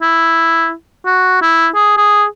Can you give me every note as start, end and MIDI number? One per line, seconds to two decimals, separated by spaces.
0.02 0.72 64
1.06 1.37 66
1.42 1.67 64
1.75 1.94 68
1.97 2.25 68